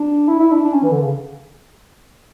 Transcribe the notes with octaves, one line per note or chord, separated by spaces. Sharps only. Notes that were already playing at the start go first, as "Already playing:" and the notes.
Already playing: D4
E4
E4
D4
D4
C#4
E3
D3
C#3